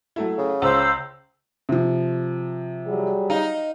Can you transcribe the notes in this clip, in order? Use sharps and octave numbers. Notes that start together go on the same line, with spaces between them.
F#3 A3 E4
C#3
C#2 C5 E6
C3 F3
F#3 G3 G#4
D#4 F5